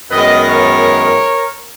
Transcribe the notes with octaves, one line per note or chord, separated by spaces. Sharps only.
F#2 D#3 G#3 B3 B4 D#5
A#4 C#5